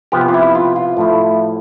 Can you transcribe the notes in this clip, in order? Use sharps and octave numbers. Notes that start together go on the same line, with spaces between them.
C3 F3 B3 G4
F4
E4
F4
F4
A2 F3 A3 E4